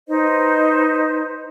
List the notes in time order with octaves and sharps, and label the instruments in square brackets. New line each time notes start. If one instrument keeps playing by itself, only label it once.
[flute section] D#4 B4 C5 D#5